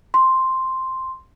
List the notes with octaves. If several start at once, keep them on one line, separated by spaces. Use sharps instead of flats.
C6